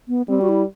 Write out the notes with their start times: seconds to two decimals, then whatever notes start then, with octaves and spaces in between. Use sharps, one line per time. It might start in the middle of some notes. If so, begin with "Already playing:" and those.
0.08 B3
0.28 G3 C4
0.41 F#4
0.49 E4